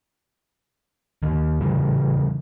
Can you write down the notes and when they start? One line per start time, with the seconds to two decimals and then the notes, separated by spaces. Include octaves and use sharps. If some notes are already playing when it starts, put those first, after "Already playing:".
1.23 D#2 D#3
1.61 C#3 E3 G3